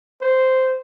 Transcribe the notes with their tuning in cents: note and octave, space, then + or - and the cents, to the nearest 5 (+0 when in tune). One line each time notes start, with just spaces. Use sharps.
C5 -10